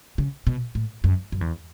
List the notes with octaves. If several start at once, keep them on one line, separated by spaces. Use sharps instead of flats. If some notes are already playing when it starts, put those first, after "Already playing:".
C#3
B2
A2
F#2
F#2
E2